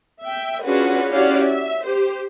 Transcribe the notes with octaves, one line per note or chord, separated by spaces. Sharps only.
E5 G5
C#4 D4 F4 F#4 G#4 B4
C#4 E4 F#4 G4 D5 F5
E5
G4 C5